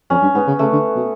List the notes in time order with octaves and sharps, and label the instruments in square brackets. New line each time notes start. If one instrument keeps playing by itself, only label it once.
[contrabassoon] F2 [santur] C#4
[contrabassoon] G2
[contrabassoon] G#2 [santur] B3
[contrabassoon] C#3
[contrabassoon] C#3 [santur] A3
[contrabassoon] D3
B2